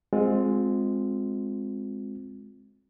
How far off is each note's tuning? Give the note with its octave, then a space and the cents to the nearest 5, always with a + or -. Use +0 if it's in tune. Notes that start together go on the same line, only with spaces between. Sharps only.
G#3 +0 C4 +0 F4 +30